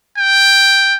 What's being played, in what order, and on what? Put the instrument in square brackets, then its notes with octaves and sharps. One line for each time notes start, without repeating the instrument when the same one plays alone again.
[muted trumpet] G5